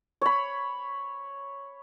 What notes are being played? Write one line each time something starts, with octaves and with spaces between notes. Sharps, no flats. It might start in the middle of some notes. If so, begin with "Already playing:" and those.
C#5 B5